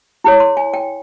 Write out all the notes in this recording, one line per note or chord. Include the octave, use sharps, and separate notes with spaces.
E4 G#4 C#5
C6
G#5
G5